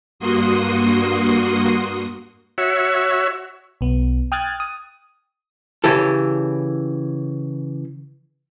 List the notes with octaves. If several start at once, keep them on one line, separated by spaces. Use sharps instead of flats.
G2 A#3 F#4 C6 D#6
F#4 C#5 E5
B1 B3
G5 D#6 F6 F#6 G#6 A6
D#6
C#3 E3 G4 A4